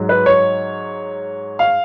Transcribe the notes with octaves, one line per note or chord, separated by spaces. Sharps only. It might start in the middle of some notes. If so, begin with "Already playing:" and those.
Already playing: G#2 F#3
B4
C#5
F5